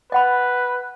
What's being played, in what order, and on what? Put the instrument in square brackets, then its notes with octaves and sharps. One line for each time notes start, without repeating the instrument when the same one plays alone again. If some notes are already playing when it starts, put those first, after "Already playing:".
[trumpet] B4 [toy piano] D#5 F#5 B5